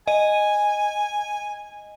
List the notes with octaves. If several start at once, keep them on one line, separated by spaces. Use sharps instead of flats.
D#5 G#5 D#7